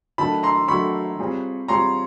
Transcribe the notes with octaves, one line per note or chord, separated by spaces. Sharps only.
D#3 F#3 A3 D4 A5 B5
A#5 C6
D#3 F#3 A3 D4 B5 C#6
G3 C4 F4 G#4 C#5
G3 C4 F4 G#4 C#5 A#5 C6